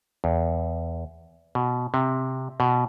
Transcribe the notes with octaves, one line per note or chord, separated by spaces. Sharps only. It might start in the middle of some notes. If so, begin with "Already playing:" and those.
E2
B2
C3
B2